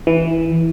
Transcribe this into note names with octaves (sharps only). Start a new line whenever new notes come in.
E3